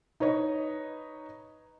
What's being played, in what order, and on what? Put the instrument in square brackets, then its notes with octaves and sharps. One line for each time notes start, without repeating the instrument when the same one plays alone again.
[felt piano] D#4 B4 C#5 D#5